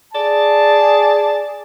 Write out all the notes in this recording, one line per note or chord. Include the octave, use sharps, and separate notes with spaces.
G#4 D5 A5